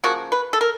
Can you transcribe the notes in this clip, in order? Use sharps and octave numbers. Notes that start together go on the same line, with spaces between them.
C#3 F3 A#3 F#4
B4
A4
A#4